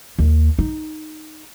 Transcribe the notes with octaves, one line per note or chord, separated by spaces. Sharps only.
D#2
D#4